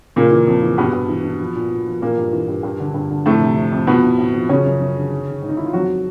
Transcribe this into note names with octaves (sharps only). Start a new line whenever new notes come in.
A#2 C#3 A#3
E3
F2
E3
G2 B2 B3
G2
E3
E3
F3
A#2
A#2
F3
A#2 E3 A#3
G2
E3
G2
G2
D3
G2
D3
F2 A2 A3
C3
F2
F2
B2 F3 B3
A2
A2
F3
C#3 F3 C#4
F#2
F#2
D3
D#3
D#3
G#2
D#4
D#3 E4
F4
F2 F#3 F#4